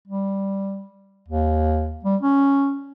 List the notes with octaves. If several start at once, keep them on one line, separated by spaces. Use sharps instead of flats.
G3
D#2
G3
C#4